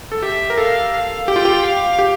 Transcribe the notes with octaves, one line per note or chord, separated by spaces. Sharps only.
A4
G4 E5
A#4
A4 F5
F5
G4 G5
F4
G4
F5
G4